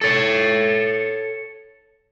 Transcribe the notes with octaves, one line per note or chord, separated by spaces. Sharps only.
A4 C#5